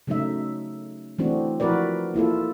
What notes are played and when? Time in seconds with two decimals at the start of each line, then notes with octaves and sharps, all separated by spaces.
0.07 C#3 F#3 A3 D#4 E5
1.18 E3 F#3 A3 C4 D4 F#4
1.60 F3 E4 F#4 A#4 B4 D5
2.14 A#3 E4 F4 A4